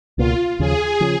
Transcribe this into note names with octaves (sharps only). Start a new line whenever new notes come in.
C#2 B2 A#3 F4
D#2 C#3 F3 G#4
C#3 F3